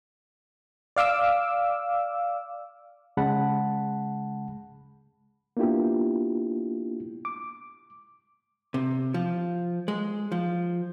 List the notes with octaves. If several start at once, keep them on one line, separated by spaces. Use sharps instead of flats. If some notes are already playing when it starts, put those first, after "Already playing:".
D5 F5 D6 E6
C#3 G#3 F#5 A5 B5
A#3 B3 D4 E4 F4 G4
D6
C3
F3
G#3
F3